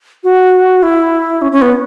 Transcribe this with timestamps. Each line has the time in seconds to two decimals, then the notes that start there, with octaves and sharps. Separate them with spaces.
0.24 F#4
0.83 E4
1.42 C#4
1.52 C#4
1.62 B3